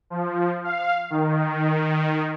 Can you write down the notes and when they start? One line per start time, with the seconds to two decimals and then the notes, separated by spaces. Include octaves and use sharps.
0.10 F3
0.64 F5
1.10 D#3